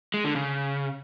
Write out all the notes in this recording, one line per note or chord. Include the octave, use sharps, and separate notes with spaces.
G#3
D3
C#3